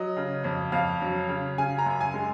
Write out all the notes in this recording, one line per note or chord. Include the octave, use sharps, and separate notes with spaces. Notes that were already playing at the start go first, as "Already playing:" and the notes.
Already playing: F#3 D#5
C#3
F2
F2 F5
F#3
C#3
C#3 G#5
A#5
F#2
G#5
G#3